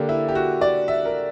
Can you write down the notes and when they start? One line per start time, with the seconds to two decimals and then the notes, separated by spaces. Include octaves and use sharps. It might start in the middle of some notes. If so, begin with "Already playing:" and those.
Already playing: D3 A#3 D4 G4
0.09 E4
0.28 G4
0.35 F#4
0.61 D5
0.88 E5
1.05 A#4